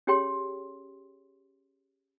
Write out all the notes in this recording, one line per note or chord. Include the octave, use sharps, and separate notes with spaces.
C#4 G4 G#4 C#5 G5 C6